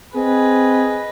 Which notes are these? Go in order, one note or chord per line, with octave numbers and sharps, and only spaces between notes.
C4 G#4 B4 D#5